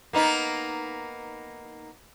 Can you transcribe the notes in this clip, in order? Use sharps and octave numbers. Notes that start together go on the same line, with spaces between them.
A#3 B3 D#4